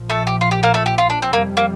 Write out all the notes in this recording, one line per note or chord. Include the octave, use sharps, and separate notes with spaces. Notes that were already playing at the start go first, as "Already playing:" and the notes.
Already playing: A#1 A#2 F3
A3 A4
G4
F4
G4
A#3 A#4
A3 A4
G4
F4
D4
C4
F2 C3 G3 A#3
A#3